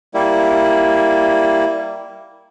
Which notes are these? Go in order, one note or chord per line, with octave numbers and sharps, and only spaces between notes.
G3 A#3 E4